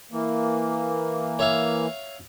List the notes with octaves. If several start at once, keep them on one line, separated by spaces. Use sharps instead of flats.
E3 A#3
C#5 E5 F5